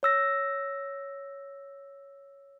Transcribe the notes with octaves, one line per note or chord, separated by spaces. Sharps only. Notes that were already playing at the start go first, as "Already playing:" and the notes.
C#5 E6 A#6